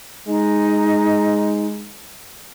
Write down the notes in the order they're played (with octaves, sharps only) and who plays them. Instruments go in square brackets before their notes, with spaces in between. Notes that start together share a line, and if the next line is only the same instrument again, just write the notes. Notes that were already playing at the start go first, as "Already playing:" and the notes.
[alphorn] G#3 [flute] D#4